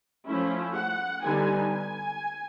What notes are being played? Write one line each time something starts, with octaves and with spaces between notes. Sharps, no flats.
F3 A3 C#4 E4
F#5
D3 G3 B3 D#4 G#5
G#5